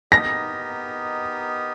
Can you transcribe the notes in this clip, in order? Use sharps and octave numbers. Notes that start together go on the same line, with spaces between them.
B3 D#4 G4 A#4 D#5 A#6